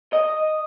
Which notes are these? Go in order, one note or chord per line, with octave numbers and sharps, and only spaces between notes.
D#5